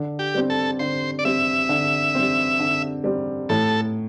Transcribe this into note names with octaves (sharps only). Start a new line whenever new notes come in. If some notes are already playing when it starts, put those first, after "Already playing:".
Already playing: D3
G4
G3 C4
A4
D3 C5
D5
G3 C4 E5
D3
G3 C4
D3
G3 C4
A2 A4